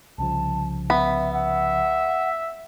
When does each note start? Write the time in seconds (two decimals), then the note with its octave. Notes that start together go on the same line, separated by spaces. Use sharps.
0.18 C2 C#3 F3 A5
0.90 B3 E5 B5
1.34 E5 F#5